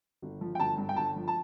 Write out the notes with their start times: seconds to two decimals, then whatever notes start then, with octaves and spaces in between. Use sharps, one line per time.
0.22 G1
0.41 F3
0.55 G5
0.59 G1 A5
0.78 G2
0.89 G5
0.96 G1 A5
1.16 F3
1.28 A5